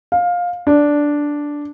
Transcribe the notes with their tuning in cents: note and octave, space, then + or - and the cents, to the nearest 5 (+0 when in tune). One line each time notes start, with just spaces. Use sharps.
F5 +15
D4 -5